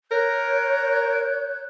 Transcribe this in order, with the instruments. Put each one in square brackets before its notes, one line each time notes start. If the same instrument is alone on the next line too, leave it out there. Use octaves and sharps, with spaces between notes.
[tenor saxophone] A#4 [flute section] C#5 F#6 G6